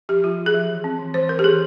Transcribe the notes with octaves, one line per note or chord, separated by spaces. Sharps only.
F3 G4
F3 F4
F3
G#4
F3
E3
C4
E3
E3 C5
E3 A#4
G4
E3 G#4